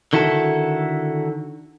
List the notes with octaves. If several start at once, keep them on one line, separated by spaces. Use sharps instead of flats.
D3 D#3 E4 F#4 A4